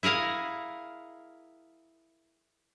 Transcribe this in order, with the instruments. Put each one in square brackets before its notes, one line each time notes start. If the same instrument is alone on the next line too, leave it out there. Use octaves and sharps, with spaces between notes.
[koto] E4 G#4 A#4 F5 F#5